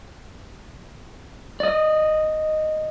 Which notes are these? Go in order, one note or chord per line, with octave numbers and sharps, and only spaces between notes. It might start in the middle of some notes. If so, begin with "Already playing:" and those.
D5 D#5